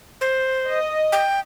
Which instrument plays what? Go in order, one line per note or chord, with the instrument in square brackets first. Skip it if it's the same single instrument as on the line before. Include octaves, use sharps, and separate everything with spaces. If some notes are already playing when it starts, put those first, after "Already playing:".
[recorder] C5
[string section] D#5
[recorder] G5